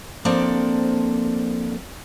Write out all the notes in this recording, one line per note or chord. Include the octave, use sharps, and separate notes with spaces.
F3 A#3 C4 D4 A4 D5